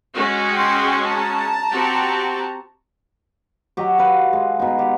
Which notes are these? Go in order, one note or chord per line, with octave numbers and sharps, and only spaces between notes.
G#3 C#4 F#4
G5 C6
A5 A#5
C4 F#4 G4
F#3 G4 D#5
B4 F5
G#3
B2 D#4
G4